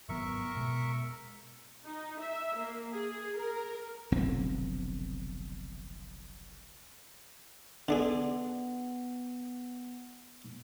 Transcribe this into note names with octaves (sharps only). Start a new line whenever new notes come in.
G#1 F#3 B3 A#4 E5 C#6
B2 G#3
D#4
E5
A#3
G#4
A#4
F1 B1 D3 C4
D3 B3 D4 G#4